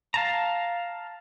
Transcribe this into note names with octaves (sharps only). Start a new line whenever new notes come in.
F5 A5 A#5